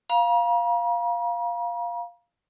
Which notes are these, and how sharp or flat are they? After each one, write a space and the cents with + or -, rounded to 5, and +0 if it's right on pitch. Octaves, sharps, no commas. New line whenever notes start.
F5 +0 A#5 +45